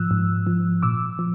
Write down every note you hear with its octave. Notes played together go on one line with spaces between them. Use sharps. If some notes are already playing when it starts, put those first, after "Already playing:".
Already playing: G#2 F3 E6 F#6
G#2
F3
A#2 D6 E6
F3